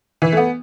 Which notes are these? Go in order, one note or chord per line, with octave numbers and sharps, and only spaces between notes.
E3
A3
B3